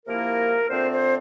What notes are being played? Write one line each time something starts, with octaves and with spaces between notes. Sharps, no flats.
C3 F3 A#3 E4 A#4
D3 A3 C4 F4 C5
C5